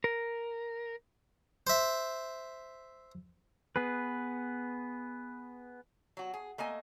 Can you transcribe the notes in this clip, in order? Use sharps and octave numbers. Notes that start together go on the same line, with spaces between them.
A#4
C5 E5
B3 G#4 B4
F#3 F#4
G#4
A3 A#3 D#5 G#5